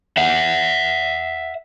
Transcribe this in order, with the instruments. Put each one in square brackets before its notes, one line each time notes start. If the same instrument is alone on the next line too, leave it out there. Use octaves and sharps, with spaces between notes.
[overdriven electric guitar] E5 F#5